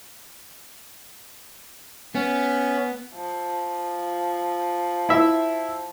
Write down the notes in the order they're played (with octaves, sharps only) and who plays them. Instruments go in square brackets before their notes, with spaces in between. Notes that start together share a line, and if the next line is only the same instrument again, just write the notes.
[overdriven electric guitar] B3 [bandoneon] C#4
[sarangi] F3
[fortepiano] E4 E5